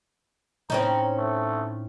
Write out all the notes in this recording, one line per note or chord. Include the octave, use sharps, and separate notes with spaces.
A2 C4 C#4 D#4 A#5
A3